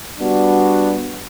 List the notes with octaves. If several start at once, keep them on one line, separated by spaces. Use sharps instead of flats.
G3 B3 D4 F#4